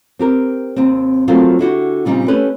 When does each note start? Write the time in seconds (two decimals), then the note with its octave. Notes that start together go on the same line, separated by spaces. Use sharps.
0.19 C4 G4 A#4
0.76 D#2 C3 C4
1.28 F#3 A3 A#3 C4 F4
1.59 D3 E4 F#4 G4
2.05 A#2 C#3 G3 C4 D#4
2.28 A3 C#4 G4 B4